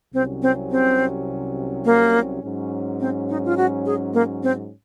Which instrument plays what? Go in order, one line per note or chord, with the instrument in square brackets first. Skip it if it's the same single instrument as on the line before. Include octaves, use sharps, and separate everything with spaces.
[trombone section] C2 C3 F#3 C#4 [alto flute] C4
[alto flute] C4
C4
A#3
[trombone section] G#2 F#3 C#4
[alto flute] C4
D#4
F4
F#4
G#4
A#3
C4